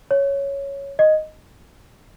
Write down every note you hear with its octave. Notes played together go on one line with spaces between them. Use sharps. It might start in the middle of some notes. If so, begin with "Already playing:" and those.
C#5
D#5